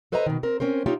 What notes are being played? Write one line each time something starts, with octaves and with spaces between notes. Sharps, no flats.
A4 B4 C5 D#5 E5 A#5
B2 D#3
C4 A#4
C4 C#4 A#4 C5
D#4 F4 G4 C#5 E5